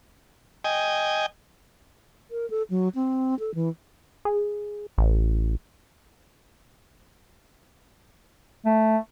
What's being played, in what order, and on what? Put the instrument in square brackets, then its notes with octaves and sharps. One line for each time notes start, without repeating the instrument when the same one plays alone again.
[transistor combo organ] D#5 G5 G#5
[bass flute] A#4
A4
F#3
C4
A4
E3
[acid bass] G#4
A1
[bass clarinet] A3